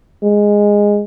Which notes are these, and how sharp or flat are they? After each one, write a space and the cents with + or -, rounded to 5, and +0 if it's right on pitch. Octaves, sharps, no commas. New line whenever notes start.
G#3 -10